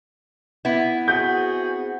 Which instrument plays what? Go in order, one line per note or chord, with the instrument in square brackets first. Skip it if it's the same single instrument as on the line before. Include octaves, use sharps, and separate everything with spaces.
[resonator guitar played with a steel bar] B3 E4
[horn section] C4 F#4 G#4 [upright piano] F#5 G6